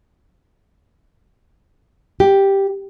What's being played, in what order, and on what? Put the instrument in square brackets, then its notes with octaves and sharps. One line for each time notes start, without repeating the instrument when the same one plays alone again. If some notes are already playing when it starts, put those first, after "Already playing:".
[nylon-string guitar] G4